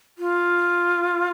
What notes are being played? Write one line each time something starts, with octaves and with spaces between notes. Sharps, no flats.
F4